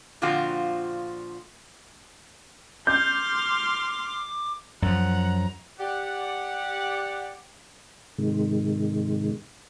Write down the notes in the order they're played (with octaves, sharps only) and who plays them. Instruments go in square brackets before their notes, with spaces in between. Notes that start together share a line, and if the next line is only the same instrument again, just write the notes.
[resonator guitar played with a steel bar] A#2 D3 F3 C4 F4 F#4
[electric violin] C6 F6 [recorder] D6 [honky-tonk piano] G6
[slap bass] F#2 F3 [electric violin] F#5 [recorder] A#5
[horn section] G4 D5 F#5
[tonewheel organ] G#2 C3 D#3 G#3